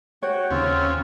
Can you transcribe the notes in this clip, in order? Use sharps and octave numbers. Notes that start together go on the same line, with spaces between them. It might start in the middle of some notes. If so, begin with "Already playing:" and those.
F#4 C#5 F#5 G5
D#2 C#3 C4 F4